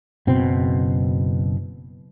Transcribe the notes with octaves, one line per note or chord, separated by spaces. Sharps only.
F#1 B2 C4